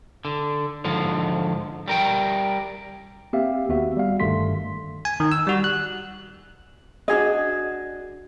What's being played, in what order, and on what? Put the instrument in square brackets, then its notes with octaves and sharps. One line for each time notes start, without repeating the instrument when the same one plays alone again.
[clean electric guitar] D3
G#2 D3 F3
G3 A#4 G5
[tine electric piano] A#3 C4 G4 E5 F5
D#2 B3 F#4 E5
G3 F5
G1 G2 D#3 A3 C6 B6
G#5
D#3
E6
G3 F#4
F#6
[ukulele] D4 F#4 G#4 D#5